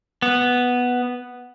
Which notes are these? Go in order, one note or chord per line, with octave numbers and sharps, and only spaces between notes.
B3